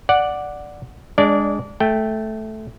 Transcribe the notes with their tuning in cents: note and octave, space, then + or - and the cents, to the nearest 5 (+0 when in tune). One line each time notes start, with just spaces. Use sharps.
D5 +0 F#5 -5
G#3 -10 D4 -5 D5 -25
A3 -10 G5 +0